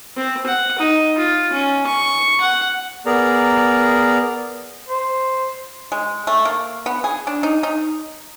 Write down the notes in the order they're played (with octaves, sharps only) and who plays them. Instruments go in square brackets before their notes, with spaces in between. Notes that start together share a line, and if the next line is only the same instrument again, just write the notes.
[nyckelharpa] C4
F#5
D#4
F4
C#4
C#6
F#5
[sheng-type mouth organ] B3 G#4 A#4 D5 A#5
[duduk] C5
[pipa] G#3
A3
A#3
B3
G#4
D4
D#4
D#4